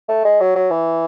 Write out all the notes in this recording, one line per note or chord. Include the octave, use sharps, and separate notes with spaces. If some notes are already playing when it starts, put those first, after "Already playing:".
A3
G#3
F#3
F#3
E3